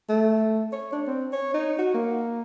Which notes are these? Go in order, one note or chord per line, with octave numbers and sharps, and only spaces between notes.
A3
C#5
D4
C4
C#5
D#4
F#4
A#3